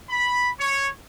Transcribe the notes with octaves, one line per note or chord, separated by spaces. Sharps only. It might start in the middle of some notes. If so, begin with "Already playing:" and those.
B5
C#5